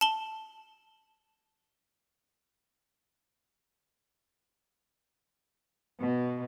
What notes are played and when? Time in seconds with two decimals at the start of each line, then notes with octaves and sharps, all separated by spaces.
0.01 A5 F#7 G7
6.00 B2